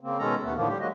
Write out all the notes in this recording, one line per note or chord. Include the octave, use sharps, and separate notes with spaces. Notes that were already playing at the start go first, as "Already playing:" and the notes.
C#3 A#3 C4
B2 D#3 G#3 C#4 A4 A#5
D#2 A3 B3
A2 D3 D#3 F3 A#3
G3 G4
D#3 F#3 G#3 A#3 F#4 D#5